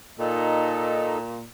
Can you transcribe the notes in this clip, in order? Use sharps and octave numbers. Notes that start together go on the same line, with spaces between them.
A#2 D#4 A4